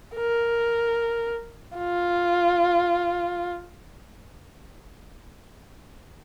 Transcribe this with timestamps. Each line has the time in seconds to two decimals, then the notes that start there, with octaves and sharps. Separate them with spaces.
0.15 A#4
1.78 F4